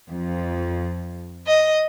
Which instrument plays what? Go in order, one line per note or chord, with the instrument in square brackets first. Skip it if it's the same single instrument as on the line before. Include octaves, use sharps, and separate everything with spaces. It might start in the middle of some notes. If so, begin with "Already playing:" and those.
[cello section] F2
[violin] D#5